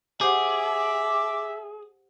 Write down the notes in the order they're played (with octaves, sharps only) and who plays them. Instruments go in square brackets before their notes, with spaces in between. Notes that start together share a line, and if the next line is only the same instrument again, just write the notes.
[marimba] G4 C5 F#5 [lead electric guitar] G#4 [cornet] E5 [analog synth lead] D6